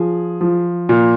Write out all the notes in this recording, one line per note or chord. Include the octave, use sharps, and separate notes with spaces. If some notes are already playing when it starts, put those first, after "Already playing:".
Already playing: F3 G#4
F3
A#2